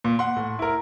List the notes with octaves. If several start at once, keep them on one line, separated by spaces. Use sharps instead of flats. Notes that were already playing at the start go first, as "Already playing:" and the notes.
A#2
F#5 C6
A2
E4 A#4